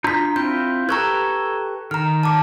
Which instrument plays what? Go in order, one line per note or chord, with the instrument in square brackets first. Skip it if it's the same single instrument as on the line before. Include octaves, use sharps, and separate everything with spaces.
[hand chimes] D4 B6 [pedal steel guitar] F4 A#5 G6
[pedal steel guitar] C4 E4 F4 [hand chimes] G6
[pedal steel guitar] G4 A4 B4 [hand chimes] A#5 C#6 G#6
[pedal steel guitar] D#3 [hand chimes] A#5 F6
[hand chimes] A5 D6